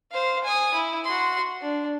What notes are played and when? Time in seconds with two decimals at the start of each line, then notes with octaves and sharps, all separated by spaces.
0.12 C5 F5
0.44 G#5 D#6
0.74 E4
1.05 F#4 C6
1.61 D4